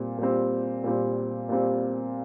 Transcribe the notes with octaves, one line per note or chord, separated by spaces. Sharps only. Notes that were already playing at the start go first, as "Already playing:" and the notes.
Already playing: A#2 G3 C4
A#2 G3 C4
A#2 G3 C4
A#2 G3 C4